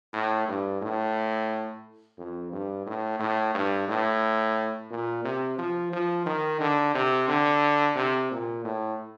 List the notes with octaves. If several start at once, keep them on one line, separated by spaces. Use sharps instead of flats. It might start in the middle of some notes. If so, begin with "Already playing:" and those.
A2
G2
A2
F2
G2
A2
A2
G2
A2
A#2
C3
F3
F3
D#3
D3
C3
D3
C3
A#2
A2